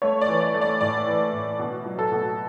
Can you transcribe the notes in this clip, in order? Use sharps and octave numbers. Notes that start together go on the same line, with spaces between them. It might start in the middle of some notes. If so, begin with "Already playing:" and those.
A3 C#5
D5
E3
D5
A3
D5
A2 D5
E3
A2
B2
F#3
A4
B2